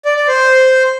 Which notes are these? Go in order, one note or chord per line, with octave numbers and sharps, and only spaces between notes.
D5
D5
C5